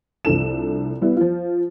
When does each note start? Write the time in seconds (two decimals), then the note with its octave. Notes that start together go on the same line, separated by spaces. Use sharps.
0.25 C2 F3 D4 A4 E7
1.01 G3 B3 E4
1.17 F3 F4